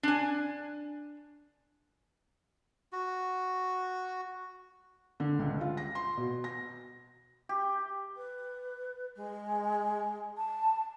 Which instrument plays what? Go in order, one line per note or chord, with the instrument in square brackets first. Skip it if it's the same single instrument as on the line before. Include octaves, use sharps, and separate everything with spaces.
[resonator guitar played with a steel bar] D4 G#5
[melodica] F#4
[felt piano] D3
C#2
F4
A#6
C6
B2
A#6
[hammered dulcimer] G4
[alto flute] B4
G#3
A5